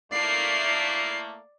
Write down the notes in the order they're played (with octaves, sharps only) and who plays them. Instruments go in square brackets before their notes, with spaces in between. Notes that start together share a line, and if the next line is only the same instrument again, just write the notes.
[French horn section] A3 A#3 E4 [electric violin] D5 C7